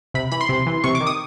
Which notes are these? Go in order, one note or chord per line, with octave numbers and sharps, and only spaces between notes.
C3 B5
E3 B5
C6
C3
E3
C3 C#6
D6
D#3
D#6